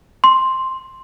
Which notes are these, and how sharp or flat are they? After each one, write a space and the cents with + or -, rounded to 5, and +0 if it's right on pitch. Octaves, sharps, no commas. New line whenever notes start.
C6 +5